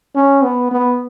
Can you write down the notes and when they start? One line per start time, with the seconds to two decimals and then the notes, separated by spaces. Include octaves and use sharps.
0.15 C#4
0.43 B3
0.71 B3